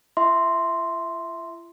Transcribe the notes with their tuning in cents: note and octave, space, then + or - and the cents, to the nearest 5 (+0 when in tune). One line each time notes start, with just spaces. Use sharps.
F4 -45 E5 +0 C6 +0